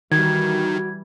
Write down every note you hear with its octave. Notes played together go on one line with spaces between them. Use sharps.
D#3 E3 G3 F#4 G#6